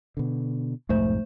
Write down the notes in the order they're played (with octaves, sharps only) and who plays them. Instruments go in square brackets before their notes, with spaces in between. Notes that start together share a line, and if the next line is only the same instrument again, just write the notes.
[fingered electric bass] B2 D3
[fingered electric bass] B1 F2 G#2 [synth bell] A3 C5